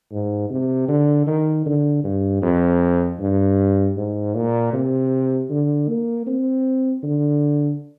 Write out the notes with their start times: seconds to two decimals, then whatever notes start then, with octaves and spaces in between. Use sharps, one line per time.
0.12 G#2
0.50 C3
0.89 D3
1.27 D#3
1.66 D3
2.04 G2
2.42 F2
3.20 G2
3.97 G#2
4.35 A#2
4.73 C3
5.50 D3
5.88 A#3
6.27 C4
7.03 D3